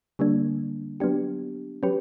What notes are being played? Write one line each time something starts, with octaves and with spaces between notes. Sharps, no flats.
D3 G3 A#3 D4
F#3 B3 D4 G4
F#3 C#4 G4 B4